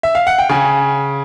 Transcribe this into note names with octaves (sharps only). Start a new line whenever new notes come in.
E5
F5
F#5
G5
C#3 G#5